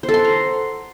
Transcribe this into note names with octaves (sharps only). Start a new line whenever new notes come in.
C5
A4
C6
F#5
A#5